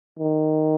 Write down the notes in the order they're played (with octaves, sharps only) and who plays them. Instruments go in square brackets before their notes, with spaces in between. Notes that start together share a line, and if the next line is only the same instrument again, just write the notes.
[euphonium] D#3